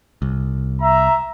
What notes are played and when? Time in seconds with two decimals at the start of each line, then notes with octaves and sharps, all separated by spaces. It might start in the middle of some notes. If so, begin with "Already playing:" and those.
0.22 C2
0.81 E5 A#5